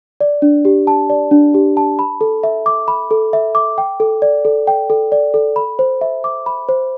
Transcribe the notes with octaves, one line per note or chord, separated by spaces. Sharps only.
D5
D4
G4
A5
D5
D4
G4
A5
B5
A4
E5
D6
B5
A4
E5
D6
G5
A4
D5
A4
G5
A4
D5
A4
B5
C5
E5
D6
B5
C5